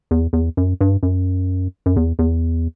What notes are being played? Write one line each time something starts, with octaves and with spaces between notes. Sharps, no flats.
E2
E2
F#2
G2
F#2
F#2
E2
E2